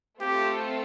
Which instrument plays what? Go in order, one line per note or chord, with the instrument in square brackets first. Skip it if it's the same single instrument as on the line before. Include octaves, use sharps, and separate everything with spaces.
[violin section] A3 C4 F4 A4 [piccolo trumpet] G4